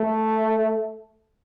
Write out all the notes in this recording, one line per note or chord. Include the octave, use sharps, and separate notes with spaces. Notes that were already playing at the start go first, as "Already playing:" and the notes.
Already playing: A3